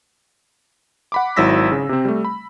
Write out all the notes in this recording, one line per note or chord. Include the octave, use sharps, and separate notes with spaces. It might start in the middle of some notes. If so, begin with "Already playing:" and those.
F#5 B5 D6
G#1 F#3 E4 E6 A#6 B6
C#3
C3 C4
G3 A3
B5